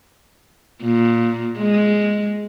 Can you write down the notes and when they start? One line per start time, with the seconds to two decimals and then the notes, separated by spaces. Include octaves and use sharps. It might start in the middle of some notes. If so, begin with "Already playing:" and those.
0.83 A#2
1.59 G#3